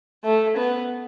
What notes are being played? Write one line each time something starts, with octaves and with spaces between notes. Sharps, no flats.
A3
B3